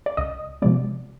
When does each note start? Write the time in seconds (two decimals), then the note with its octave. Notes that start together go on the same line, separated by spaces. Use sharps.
0.06 D5
0.17 C#2 D#5
0.62 C3 F3 G#3 B3 D5